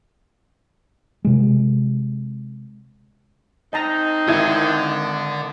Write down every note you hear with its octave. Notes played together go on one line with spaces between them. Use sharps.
C3 G#3
C4 D4 D#4 D#5 A5 A#5
G#1 D3 E4 G#6